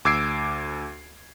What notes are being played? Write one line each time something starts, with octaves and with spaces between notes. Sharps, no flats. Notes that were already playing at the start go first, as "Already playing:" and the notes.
D2 D6 E6 G#6 C7 D7